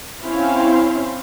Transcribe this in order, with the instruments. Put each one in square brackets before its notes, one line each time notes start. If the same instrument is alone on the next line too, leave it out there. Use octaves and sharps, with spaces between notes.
[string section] C4 C#4 E4 C5 F5